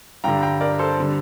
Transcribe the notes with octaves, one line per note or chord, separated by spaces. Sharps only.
G2 D3 G3 G5 A#5
G5 A#5
A#4 D5
A4 C5
D3 G3